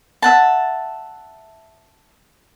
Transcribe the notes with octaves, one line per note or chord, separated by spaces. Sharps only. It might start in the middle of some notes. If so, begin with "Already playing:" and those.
E5 F#5 A5